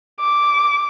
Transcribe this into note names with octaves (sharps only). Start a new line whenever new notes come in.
D6